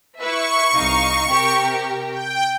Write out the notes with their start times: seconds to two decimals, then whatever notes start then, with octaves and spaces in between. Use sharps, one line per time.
0.19 E4 B4 E5 C#6
0.75 C2 D#4 F5
1.29 C3 G4 A#4
2.09 G5